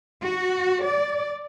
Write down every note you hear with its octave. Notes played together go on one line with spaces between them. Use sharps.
F#4
D5